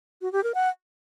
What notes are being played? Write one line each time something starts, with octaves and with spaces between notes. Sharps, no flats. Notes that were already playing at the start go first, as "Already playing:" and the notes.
F#4
G4
A#4
F#5